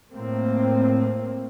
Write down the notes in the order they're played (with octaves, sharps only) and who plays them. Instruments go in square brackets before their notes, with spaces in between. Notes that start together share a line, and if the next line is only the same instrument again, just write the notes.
[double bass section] A2 A#3 C4